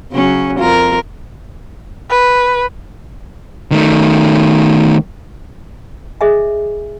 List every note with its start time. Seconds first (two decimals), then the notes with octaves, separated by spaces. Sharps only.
0.12 C#3 F#3 C#4
0.58 F2 F4 A#4
2.10 B4
3.72 D#3 A3
6.21 G#4 D#5 E5 G#5